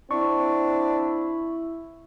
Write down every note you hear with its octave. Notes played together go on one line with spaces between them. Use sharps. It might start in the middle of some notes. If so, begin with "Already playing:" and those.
C4 D4 E4 C#6